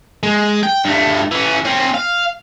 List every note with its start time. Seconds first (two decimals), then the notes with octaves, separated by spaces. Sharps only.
0.23 G#3
0.63 G5
0.85 G2 A3
1.31 E3 C#4
1.65 C4 C#4
1.94 F5